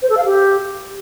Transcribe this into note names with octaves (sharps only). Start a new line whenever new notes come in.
C5
A4
F5
G4